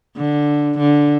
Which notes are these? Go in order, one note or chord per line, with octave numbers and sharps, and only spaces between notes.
D3
D3